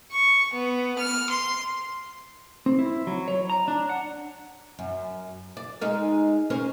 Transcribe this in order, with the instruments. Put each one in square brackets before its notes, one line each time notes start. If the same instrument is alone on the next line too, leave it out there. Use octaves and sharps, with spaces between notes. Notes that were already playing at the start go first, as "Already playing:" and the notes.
[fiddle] C#6
B3
F6
C6
[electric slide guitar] C4
E4
F#3
C#5
A#5
D4
F#5
[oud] F#2
D5
G#3 D#4 A#4
C#4 A#4 C5